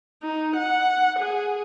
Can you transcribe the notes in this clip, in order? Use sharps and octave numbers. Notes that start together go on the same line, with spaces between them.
D#4
F#5
G#4